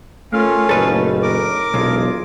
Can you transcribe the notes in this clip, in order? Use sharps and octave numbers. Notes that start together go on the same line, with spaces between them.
A3 C#4 F4 A4 A#4 F5
F#1 A#2 A3 D#4 A4 B4
A#4 D6
E1 B1 F4 G#4